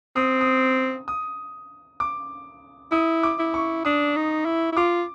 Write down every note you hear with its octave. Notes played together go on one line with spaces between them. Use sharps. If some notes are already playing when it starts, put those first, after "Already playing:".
C4 D#6
D#6
D#6
D6
E4 D#6
D6
E4
C#6
D4 D#6
D#4
E4
E4
F4 D6